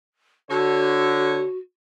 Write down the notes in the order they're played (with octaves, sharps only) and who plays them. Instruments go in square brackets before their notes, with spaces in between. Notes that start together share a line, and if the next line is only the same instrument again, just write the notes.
[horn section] D3 C#5 [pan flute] F#4